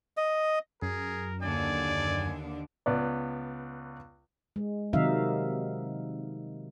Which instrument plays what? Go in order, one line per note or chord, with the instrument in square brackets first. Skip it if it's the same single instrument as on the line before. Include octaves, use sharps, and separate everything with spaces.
[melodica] D#5
[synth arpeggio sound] F#2 [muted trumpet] G#4 [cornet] A#4
[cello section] D#2 D3 D4 [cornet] D5 [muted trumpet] G#5
[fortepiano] C#2 B3 D5
[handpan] G#3
C3 D#3 F#3 D#4 E5 F5